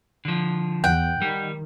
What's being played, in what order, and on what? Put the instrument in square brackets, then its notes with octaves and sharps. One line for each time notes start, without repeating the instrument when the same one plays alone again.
[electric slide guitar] D3 F3
[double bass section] E2 [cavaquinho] F#5 G5
[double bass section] D#3 [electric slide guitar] G3